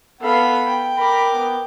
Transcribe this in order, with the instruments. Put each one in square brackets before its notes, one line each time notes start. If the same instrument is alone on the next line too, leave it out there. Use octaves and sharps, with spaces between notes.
[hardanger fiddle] B3 B5 [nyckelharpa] A4 F5 [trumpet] F#5
[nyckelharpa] G5
[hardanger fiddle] A#4 D6 [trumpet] B5
[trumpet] B3